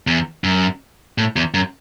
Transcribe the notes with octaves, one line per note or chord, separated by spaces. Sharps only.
E2
F#2
A2
E2
F#2